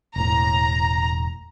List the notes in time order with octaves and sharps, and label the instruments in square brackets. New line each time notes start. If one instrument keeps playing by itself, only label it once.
[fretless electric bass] E1 A2 [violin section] A#5